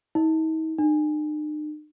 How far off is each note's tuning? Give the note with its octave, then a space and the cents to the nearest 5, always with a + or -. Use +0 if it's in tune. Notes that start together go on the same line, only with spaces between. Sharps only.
D#4 +40
D#4 -45